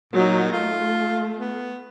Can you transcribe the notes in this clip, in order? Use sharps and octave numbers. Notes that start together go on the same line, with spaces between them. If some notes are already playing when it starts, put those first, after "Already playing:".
A#2 F#3 D#4
A3 F4
B3